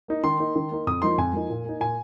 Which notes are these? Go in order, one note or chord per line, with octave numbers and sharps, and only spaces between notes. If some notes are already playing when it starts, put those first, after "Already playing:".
A#3 D#4
D#3 C6
A#3 D#4
D#3
A#3 D#4
F2 D#6
F3 A#3 D#4 C6
F2 G#5
F3 A#3 D#4
A#2
A#3 D#4
A#2 G#5